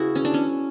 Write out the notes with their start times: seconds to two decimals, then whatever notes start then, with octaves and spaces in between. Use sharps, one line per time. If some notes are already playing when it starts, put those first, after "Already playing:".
Already playing: C#3 B3 E4 F#4 G#4
0.15 C#4
0.25 D4
0.34 C#4